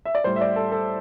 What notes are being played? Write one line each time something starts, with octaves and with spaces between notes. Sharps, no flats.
E5
D5
A2 G3 C5
E5
D5
A4
A4